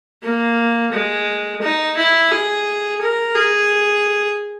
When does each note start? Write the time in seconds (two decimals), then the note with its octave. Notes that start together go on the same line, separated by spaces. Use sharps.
0.23 A#3
0.92 G#3
1.62 D#4
1.97 E4
2.31 G#4
3.01 A#4
3.35 G#4